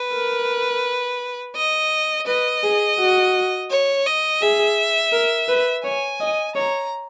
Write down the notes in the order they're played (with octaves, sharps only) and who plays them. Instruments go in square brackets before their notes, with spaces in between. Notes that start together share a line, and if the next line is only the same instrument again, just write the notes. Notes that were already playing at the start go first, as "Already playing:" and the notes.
Already playing: [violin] B4
[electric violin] A#4
[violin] D#5
[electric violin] B4 [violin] D#5
[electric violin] G#4
F#4
[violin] C#5
D#5
[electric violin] G#4 [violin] E5
[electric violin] A#4
B4
[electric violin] C#5 [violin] G#5
[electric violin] D#5
[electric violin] C#5 [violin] A#5